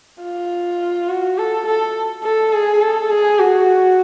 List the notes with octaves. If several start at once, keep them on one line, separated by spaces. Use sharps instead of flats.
F4
F#4
A4
A4
A4
G#4
A4
G#4
F#4